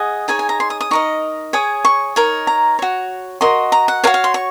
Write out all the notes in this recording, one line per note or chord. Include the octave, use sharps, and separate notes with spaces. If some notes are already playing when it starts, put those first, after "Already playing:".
Already playing: G#4 D#5 F#5
D#4 G#4 C#5 G#5
G#5
A#5
C6
D#6
D#6
D#4 A#4 D#5 C#6
G#4 C#5 D#6
C#6
D#4 A#4 C#5
A#5
F#4 C#5
F#4 A#4 D#5 C6
A#5
F#5
F#4 A#4 C#5 F5
F5
C6
C#6